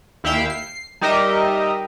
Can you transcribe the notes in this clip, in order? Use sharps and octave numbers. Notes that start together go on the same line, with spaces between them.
D#2 E4 E5 F5 G5 E6
C7
G3 D#4 G4 A#4 D#5 E5